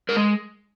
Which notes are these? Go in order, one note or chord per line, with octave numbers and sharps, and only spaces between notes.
G#3 A#4